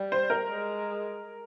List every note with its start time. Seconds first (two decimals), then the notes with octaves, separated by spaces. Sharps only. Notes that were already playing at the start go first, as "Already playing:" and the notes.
Already playing: G3
0.12 C5
0.30 A#4
0.50 G#3